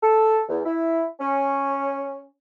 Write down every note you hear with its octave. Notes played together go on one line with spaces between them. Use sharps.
A4
E2
E4
C#4